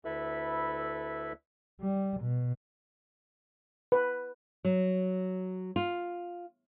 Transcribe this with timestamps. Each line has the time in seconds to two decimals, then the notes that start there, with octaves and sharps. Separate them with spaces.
0.05 D2 E4 A4 B4 E5 B5
1.81 G3
2.21 B2
3.92 B4
4.65 F#3
5.76 F4